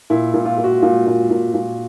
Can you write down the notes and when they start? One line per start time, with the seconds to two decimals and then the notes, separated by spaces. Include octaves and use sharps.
0.10 A#2 E4
0.34 A#2
0.46 F4
0.58 A#2
0.64 F#4
0.82 A#2
1.06 A#2
1.30 A#2
1.54 A#2